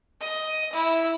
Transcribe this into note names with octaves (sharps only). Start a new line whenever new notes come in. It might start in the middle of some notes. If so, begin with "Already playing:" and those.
D#5
E4